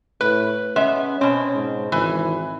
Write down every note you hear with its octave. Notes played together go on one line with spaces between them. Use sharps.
A2 B4
G#3 B3 C#4 E5
B2 C4 C#4
G#2
G#1 E3